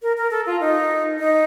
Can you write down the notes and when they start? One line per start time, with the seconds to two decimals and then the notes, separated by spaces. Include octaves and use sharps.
0.02 A#4
0.18 A#4
0.31 A4
0.46 F4
0.61 D#4
1.19 D#4